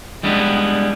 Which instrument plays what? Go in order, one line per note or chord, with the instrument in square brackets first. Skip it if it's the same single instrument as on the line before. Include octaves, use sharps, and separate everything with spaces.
[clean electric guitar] G3 G#3 B3 D4 E4